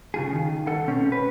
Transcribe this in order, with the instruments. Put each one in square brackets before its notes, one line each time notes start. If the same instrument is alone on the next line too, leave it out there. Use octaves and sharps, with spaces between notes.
[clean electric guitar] C#3 F4 G#4
D#3
A4 F#5
B2 C4 C#4
B4